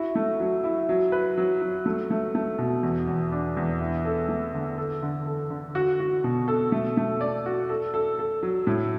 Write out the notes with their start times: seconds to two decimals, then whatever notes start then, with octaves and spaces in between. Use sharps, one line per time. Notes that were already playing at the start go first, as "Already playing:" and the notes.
Already playing: E4 F#4
0.15 A3
0.40 F#3
0.64 E4
0.89 F#3
1.12 B4
1.37 F#3
1.61 F#3
1.86 A3
2.11 A3
2.35 A3
2.58 B2
2.83 E2
3.08 E2
3.32 D4
3.57 E2
3.80 E4
4.05 A4
4.29 A3
4.54 D3
4.78 A4
5.02 D3
5.26 A4
5.50 D3
5.75 F#4
6.00 F#4
6.24 B2
6.48 A4
6.72 A3
6.97 A3
7.21 D5
7.46 F#4
7.69 A4
7.94 A4
8.19 A4
8.43 F#3
8.67 A2